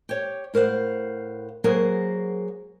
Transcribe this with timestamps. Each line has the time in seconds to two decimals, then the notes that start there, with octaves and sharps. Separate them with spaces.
0.09 G4 C#5
0.54 A2 A#4 C5 F5 F#5
1.64 F#3 A#3 G#4 A#4 C5 F#5